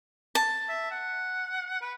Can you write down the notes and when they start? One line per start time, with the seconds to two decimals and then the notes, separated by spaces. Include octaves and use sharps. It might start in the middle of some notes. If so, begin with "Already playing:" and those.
0.35 A5
0.69 E5
0.91 F#5
1.81 B4